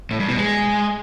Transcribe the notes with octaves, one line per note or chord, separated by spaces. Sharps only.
A2
G2
B2
G#3